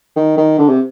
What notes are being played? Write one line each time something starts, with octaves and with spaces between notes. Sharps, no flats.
D#3
D#3
D3
C3